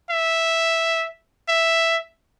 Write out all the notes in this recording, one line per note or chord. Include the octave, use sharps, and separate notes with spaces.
E5
E5